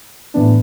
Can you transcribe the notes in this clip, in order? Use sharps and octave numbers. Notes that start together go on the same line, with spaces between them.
A2 E3 B3 D4